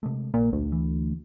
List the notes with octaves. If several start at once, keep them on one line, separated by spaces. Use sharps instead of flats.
C3 G#3 A3
A#1 A#2
D2
E3